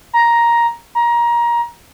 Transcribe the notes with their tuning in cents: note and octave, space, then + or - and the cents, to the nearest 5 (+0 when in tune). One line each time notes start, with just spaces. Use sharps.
A#5 +10
A#5 +20